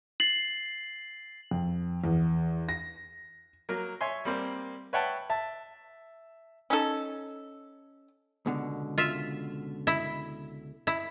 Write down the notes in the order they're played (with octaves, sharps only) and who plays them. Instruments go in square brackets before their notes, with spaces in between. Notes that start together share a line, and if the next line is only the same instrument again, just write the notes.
[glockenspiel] A6 C7 F#7
[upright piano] F2
E2
A#6
[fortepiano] F#3 A#3 A#4
C#5 E5 G#5 C6
G3 A#3 C4
B4 C#5 E5 F#5 G5 A5
E5 A5
[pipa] C#4 D#4 A4
[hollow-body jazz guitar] C#2 B2 D3
[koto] F4 E5
E4
E4